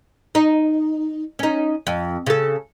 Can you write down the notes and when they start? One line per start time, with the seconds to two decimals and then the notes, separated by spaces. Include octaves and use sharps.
0.35 D#4
1.39 C#4 D#4
1.87 F2
2.27 C#3 A4